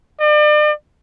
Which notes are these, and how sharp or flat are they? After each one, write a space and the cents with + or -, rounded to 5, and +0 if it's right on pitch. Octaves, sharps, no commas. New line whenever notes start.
D5 +40